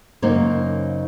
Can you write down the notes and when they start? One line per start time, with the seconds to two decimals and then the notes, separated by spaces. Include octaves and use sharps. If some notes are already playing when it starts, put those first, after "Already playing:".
0.22 F#2 C#3 A#3 D#4 C5 C#5